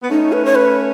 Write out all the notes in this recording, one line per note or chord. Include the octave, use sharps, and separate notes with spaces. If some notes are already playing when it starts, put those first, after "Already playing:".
B3
A3 C#4 D#4
B4
C#5
B4